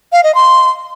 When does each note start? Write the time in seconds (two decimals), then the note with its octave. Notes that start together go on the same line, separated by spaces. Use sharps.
0.12 F5
0.24 D#5
0.35 C6